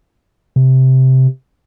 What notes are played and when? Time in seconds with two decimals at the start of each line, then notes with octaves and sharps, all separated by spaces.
0.56 C3